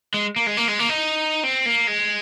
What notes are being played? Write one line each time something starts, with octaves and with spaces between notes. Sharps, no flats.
G#3
A#3
G#3
A#3
G#3
A#3
D#4
C4
A#3
G#3